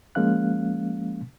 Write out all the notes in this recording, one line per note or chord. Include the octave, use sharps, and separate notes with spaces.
F3 G#3 A#3 C#4 F5 F#6